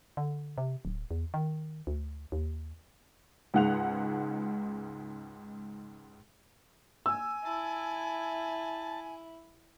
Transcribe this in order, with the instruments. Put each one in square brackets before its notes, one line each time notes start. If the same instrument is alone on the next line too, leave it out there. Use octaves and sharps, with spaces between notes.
[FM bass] D3
C3
D1
E2
D#3
D2
D#2
[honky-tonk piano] C#2 G#2 G#4 F#5 F#6 F7
[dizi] G#5 [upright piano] E6
[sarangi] E4 [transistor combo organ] A5